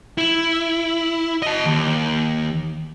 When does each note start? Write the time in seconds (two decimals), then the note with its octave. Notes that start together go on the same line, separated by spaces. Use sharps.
0.18 E4
1.42 D#5 A5
1.65 D#2